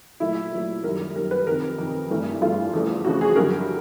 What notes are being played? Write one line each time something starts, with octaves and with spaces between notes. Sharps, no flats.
A#2 F#3 A3 E4
A#2 F#3 A3
F#2 D#3 G3 A#4
F#2 D#3 G3 A#4
B4
F2 C3 D#3 A#4
F2 C3 D#3
G2 E3 A3
G2 E3 A3 F4
E2 C#3 F3 A3
E2 C#3 F3 A3 F#4
G#4
F#2 D3 G3 A#4